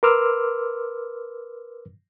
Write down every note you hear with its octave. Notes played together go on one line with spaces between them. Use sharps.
A#4 B4 C6 D6 E6 F6